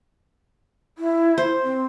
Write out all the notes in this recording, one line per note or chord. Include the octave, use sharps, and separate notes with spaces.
E4
C5
C4